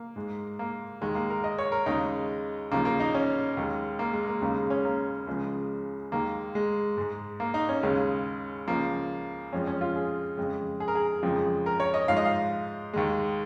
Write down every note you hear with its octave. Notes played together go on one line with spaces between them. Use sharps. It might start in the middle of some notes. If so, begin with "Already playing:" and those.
Already playing: A#3
G#2 G#3
A#3
D#2 D#3 G#3
A#3
A#4
D#5
C#5
A#4
D#2 C#3 G#3 D#4
D#2 C#3 F3 A#3
A#3
D#4
C#4
D#2 D#3 G#3
A#3
G#3
A#3
D#2 C#3 G#3 A#3
C#4
A#3
C#2 C#3 F3 G#3
D#2 D#3 G#3 A#3
G#3
G#2 G#3
A#3
D#4
C#4
D#2 C#3 G#3
C#2 C#3 F3 A#3
F2 F3 G#3 C#4
C#4
F4
G#4
F2 C#3 G#3
G#4
A#4
G#4
F2 C#3 F3 G#3
A#4
C#5
D#5
G#2 F3 G#3 F5
D#5
F5
D#2 D#3 G#3